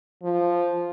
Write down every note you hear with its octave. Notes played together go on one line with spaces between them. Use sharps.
F3